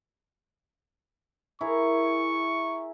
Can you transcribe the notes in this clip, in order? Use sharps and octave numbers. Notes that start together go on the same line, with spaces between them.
E4 G#4 A#4 C#6